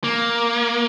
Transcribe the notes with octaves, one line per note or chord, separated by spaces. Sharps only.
A#3